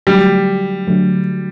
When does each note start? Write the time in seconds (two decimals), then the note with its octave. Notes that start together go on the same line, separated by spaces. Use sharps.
0.07 D3 F#3 G3 A3
0.88 D3 F#3 A3